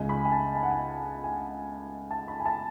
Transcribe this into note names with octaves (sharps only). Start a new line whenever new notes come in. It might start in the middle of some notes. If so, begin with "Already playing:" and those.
Already playing: C#2 C#3 G#3 G#5
B5
G#5
A5
G#5
F#5
G#5
G#5
A5
B5
G#5
A5